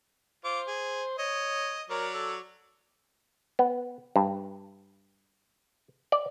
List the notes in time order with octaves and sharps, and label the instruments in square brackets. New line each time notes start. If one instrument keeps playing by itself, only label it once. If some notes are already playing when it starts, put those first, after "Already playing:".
[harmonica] F4 D6 [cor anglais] C5
[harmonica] G#4
[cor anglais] C#5 [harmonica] D#5
[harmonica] F#3 C#5 D5 [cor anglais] A#4
[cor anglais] A4
[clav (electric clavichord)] B3
G2
D5